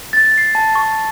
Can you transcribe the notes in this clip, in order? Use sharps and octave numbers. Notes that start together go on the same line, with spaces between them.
A6
C7
A5
C#6